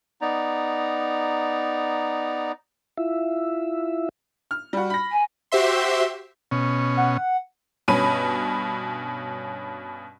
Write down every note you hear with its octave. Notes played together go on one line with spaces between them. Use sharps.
B3 D#4 D5 A#5
E4 F4 E5
F6
G3 F#4
B5 A#6
G#5
F#4 G4 C5 E5 C6
B2 C#4
F#5
G2 B2 C#4 B5 D#7